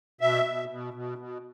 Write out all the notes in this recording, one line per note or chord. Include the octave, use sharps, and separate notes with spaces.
B2 E5
B2
B2
B2
B2